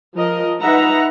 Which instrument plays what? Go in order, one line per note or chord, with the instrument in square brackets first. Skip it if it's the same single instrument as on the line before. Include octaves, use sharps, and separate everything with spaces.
[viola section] F3 A#4 D#5
D#4 B4 E5 F#5 A#5